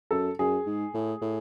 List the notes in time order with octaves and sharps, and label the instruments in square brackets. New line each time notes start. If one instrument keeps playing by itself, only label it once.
[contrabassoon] F#2 [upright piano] A4
[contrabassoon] F#2 [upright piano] G#4
[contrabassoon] G#2
A2
A2